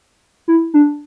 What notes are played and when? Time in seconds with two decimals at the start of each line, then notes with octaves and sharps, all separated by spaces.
0.48 E4
0.74 D4